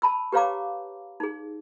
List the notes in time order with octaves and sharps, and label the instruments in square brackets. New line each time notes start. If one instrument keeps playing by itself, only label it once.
[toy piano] A5 B5 E6
G4 B4 C#5 F5 A#5 D6
D#4 G#4